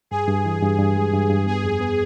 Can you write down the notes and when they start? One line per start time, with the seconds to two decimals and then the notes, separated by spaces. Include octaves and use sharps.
0.11 G2 G#4
0.28 G2
0.45 E3
0.62 G2
0.79 G2
0.96 G#3
1.13 G2
1.30 G2
1.47 B3 G#4
1.64 F2
1.81 B3